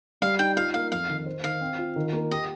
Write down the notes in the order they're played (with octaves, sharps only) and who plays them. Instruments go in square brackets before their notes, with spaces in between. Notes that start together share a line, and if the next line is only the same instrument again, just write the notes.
[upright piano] G3 [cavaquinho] F5
[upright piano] D#4 [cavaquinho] G5
[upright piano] F4 [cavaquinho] F5
[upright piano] A#3 [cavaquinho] F5
[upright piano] F2 [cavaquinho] F5
[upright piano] D#3
C5
[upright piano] D#3 [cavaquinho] F5
[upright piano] C4
F4
D#3
A#3
[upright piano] G4 [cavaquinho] D#5